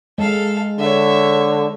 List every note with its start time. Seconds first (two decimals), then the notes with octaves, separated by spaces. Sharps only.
0.18 G#3 A4 F5
0.79 D3 C#5 E5